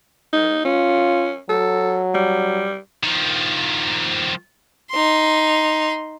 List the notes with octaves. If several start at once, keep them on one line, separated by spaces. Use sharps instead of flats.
D#4
C#4 F4
F#3 A4
G3
D#3 F3
D#4 C6